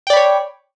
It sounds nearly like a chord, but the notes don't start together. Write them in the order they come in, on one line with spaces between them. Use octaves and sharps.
G5 D5 B5 C#5